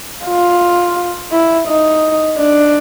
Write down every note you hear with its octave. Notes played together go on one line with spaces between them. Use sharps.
F4
E4
D#4
D4